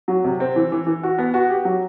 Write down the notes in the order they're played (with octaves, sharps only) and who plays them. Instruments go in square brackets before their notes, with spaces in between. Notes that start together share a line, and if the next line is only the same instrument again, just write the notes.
[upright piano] F#3
C3
C4
E3
E3
E3
F#4
B3
F#4
G4
F#3